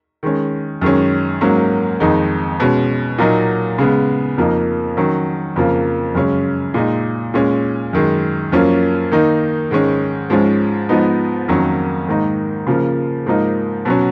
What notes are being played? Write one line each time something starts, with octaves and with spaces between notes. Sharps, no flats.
D#3 G#3 C#4
F#2 D#3 G#3 C#4
G#2 F#3 A#3 C#4
F2 D#3 G#3 D#4
B2 G#3 C#4
A#2 F#3 A#3 D#4
C#3 G#3 B3
F2 F3 A#3 D#4
D#3 F#3 C#4
F2 C#3 F3 A#3
F#2 C#3 G#3 C#4
A#2 G#3 D#4
A#2 G#3 C#4
F#2 D#3 G#3
F#2 F3 A#3 C#4
D#3 A#3 D#4
G#2 D#3 G#3 C#4
G#2 F3 G#3 C#4
G#2 F3 B3 D#4
F2 D#3 F#3 A#3 C#4
G#2 D#3 A#3 D#4
C#3 F3 A#3
G#2 F3 A#3 D#4
B2 F#3 C#4